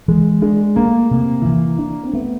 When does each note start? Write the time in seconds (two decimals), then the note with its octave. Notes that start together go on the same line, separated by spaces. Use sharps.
0.08 E3 G#3
0.42 G#3 D4
0.76 A3 A#3
1.11 C3
1.45 E3
1.79 D4
2.03 C4
2.13 A3 B3